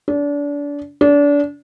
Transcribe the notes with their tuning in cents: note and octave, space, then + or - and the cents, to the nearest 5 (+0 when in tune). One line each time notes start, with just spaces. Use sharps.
D4 -30
D4 -30